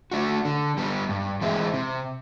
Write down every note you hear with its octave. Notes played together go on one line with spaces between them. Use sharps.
A3 D4 F#4
D3
G3 B3
G2
E3 G#3 C4 E4
C3